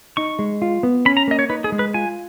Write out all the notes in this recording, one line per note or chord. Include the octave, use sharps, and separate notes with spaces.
D#4 C#6
G#3
F4
B3
C#4 B5
A#5
A#3 D#5
C#5
D#4 B4
G#4
G#3
B4
F4 G#5